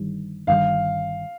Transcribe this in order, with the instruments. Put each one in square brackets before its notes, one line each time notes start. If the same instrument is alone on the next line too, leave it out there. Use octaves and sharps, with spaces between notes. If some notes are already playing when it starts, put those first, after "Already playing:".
Already playing: [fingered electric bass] G1 G2 D#3 G3
[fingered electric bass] G1 G2 D#3 G3 [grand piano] F5